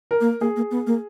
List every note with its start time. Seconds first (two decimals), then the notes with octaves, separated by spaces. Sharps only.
0.11 A#4
0.21 A#3
0.41 A#3 G#4
0.56 A#3
0.71 B3
0.87 A#3